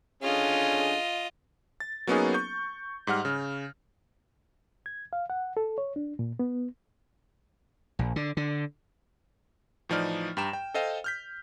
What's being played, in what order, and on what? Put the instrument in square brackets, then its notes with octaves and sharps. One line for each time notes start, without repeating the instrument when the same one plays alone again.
[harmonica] D3 C#4 G#4 [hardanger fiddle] F4 D#5
[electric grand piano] A6
F#3 A#3 B3 C#4 D#4 G#4
C#6 G6
G#2 G3 F#5 F6
C#3
[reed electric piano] G#6
F5
F#5
A4
C#5
D4
A#2
B3
[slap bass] A#1
D3
D3
[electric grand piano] A2 E3 F3 D#4 D5 F6
G2 G4 G5 A#5 E7
G5
A4 C5 D#5 F5 G5
F6 G6 B6